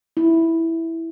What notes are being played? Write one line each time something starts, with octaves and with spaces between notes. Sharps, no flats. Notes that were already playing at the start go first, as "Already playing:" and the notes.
E4